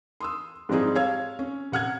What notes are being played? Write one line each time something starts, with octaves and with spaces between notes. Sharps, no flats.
C6 D#6 E6
G#2 F3 G3 C4 D#4 G#4
C#5 F5 E6 G#6
C#4
C3 F#5 F6 G#6